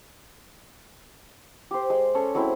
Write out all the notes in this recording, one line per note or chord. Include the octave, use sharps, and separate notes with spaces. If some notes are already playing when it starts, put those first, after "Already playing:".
G4 C5
G#3
C#4 A4 C#5 E6
F#3 G#3 C4 E4